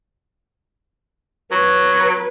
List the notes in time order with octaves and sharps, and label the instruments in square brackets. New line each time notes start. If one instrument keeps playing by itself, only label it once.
[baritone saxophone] F#3 [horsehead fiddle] B4